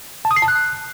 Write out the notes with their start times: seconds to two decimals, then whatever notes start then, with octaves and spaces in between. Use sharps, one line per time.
0.25 A5
0.31 D#6
0.36 C7
0.42 A5
0.48 F#6